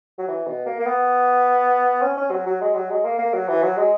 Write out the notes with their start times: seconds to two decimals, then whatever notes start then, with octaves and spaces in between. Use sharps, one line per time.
0.19 F#3
0.28 E3
0.47 B2
0.66 A#3
0.79 A#3
0.86 B3
2.02 C#4
2.17 C#4
2.31 F#3
2.46 F#3
2.61 G#3
2.74 F#3
2.90 G#3
3.05 A#3
3.19 A#3
3.33 F#3
3.48 E3
3.62 F#3
3.77 G#3